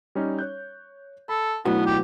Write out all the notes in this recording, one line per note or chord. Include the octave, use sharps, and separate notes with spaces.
G3 C#4 D#4
C#5 F#6 G6
A4 B5
B1 A2 B3 D4 E4 F#4 B4
G4